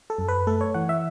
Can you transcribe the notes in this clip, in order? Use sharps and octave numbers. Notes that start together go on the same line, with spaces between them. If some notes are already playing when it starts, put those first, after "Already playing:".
A4
F#2
B4
A3 A4
C#5
E3 F#5
E5